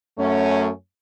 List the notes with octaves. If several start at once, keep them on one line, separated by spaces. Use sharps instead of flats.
F#2 A3 C#4